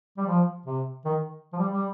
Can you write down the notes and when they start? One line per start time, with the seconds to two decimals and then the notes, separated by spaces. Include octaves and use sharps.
0.17 G3
0.26 F3
0.66 C3
1.05 D#3
1.53 F3
1.58 G3
1.72 G3